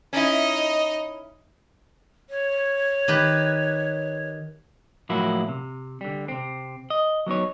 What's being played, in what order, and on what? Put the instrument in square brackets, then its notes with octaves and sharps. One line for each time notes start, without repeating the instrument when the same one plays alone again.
[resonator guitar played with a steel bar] C#4 E4 [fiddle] D#4 D#5
[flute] C#5
[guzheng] D#3 G4 B4
[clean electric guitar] A2 F3 F#3 A#3 E4 F#4
C3
D3 G3
C3 C4
D#5
F#3 B3 D#4 C#5